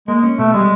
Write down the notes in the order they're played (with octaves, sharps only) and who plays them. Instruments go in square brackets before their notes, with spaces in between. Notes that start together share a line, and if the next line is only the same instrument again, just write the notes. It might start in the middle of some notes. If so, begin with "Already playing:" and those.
[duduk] G#3 [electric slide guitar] A#3
[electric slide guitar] C#4
[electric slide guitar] B2 [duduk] A3
[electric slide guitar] G3 [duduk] G#3